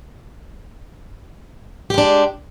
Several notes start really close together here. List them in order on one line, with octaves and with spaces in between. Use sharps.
G4 G#3 D4